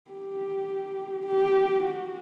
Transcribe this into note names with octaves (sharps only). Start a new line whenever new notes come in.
G4
G4
F#4